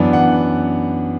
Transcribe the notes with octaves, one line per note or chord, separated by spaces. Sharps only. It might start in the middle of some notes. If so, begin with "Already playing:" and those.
Already playing: F#2 E3 B3 D4
F#5